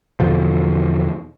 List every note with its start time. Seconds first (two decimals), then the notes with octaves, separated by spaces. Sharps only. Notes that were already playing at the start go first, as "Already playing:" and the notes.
0.20 E2 B2 D3 F3